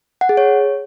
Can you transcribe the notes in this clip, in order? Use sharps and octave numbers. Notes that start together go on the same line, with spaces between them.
F#5
G#4
C#5